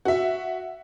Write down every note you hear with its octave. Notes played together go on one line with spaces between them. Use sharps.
F#4 E5